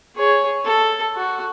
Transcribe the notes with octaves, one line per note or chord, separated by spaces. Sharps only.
G#4 C#5
A4
F#4